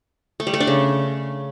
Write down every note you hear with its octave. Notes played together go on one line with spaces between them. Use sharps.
A3
G3
A3
D4
C#3